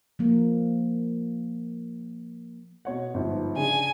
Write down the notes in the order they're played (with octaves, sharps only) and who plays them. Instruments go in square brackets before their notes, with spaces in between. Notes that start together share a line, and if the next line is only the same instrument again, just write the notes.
[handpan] F3 A#3
[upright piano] B2 C#5 F#5
G1 G#2 F3
[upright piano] C#3 D4 G#4 [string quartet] G#5